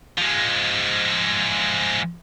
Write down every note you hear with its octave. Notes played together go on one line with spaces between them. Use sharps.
F3 G#3